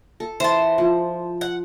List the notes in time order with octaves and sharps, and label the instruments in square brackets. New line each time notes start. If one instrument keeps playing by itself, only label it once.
[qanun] A4
[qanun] E3 [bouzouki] C5 A5
[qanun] F3
[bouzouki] F#5